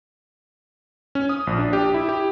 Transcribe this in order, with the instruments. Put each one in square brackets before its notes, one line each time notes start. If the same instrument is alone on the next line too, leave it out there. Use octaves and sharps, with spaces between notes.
[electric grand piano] C#4
D#6
A#1
D4
G4
E4
G4